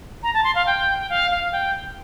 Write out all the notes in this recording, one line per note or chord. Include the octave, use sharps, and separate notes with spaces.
A#5
A5
C6
F5
G5
G5
F5
F5
G5